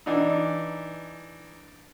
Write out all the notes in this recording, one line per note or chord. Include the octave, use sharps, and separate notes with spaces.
E3 D4 D#4